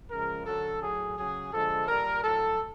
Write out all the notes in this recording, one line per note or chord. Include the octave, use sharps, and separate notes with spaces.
C#3 F3 G#3 A#4
D3 F#3 A4
A2 F#3 G#4
C#3 F#3 G#4
D3 F3 G#3 A4
A#2 G3 A#4
A2 F#3 A4